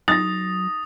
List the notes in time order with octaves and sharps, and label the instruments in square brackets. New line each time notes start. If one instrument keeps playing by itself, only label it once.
[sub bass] F#3 [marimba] D#4 [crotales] D#6 [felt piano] A6 A#6